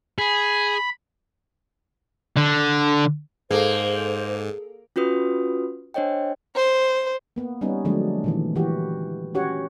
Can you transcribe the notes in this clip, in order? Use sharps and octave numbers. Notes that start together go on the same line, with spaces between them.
G#4 B5
D3
G#2 A#3 G#4 A4 C5
C#4 F4 F#4 B4 D#6
D4 C5 C#5 D#5 G5
C5
A#3 B3
G3 B3 C#4 D#4
D3 F3 F#3 G#3 A3 D4
A#2 D#3 E3
E3 F#4 G4
C#4 F#4 G4 C#5 F#5